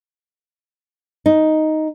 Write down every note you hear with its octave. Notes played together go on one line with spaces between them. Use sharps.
D#4